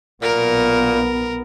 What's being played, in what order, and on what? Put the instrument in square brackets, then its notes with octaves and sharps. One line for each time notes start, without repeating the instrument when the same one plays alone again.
[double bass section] B1 B3 [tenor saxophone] A#2 [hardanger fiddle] A#4